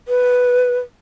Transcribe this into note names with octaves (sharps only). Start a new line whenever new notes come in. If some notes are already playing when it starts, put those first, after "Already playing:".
B4